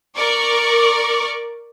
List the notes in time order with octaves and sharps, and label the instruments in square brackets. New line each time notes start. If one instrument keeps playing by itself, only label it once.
[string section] A#4 D5 C#6 D6